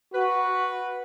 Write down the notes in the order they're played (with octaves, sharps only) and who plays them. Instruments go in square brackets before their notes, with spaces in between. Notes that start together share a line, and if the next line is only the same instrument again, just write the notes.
[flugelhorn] F#4 [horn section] B4